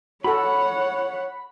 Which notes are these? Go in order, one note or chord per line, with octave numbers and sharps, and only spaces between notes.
F#4 A4 C#5 F#5 B5